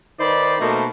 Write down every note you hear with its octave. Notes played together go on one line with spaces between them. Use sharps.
D#3 D#4 B4 C5 D5 B5
B2 A3 A#3 D#4 A#4 C5